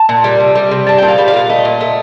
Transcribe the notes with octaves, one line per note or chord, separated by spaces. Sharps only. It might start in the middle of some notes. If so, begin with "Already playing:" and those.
Already playing: A5
A#2
G3
C3
G3
C3
G3 A5
G5
A#2
F5
G3
F5
A#2
A3 D#5
A#2
A3